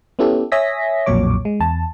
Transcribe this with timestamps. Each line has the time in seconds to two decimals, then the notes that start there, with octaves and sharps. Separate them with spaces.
0.19 B3 C#4 E4 G4 A4
0.52 C#5 E5 G#5 D#6 A#6 B6
1.06 B1 F2 A#2 F#3 C#5 D6
1.45 G#3
1.60 E2 A5